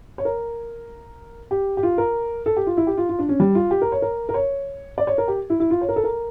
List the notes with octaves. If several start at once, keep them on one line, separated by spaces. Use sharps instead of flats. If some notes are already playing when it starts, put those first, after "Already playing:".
C#5
A#4
G4
G4
F4
A#4
A4
G4
F4
E4
G4
F4
F4
D4
C#4
G3
F4
G4
A#4
C#5
A#4
A#4
C#5
D5
C#5
A#4
G4
E4
E4
F4
C#5
A#4
A4
A#4